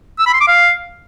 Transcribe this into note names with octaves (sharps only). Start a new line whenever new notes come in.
E6
B5
C6
D6
F5